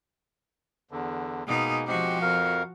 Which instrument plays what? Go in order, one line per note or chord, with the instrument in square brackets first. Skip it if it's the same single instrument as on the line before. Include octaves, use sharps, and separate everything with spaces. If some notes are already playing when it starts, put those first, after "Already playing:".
[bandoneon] E2 D3
[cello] B2 D#4 [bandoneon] G#3 A#3 G#4
[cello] F3 F#4 [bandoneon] G#3 C4 G4
[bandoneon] F2 A#4 F5